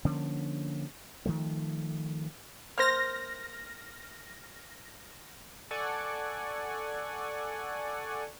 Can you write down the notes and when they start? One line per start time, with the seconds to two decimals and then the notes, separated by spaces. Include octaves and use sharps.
0.05 D3 F3 A#3 C#4
1.26 D#3 F3 A3
2.78 A#3 C5 F6 A#6
5.71 A4 D5 F#5 G#5 C#6